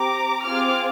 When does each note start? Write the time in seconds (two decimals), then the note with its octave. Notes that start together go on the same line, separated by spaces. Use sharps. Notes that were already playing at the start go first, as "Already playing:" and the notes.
Already playing: C4 G4 A#5 D6
0.45 C4 F4 G#4 D6 F6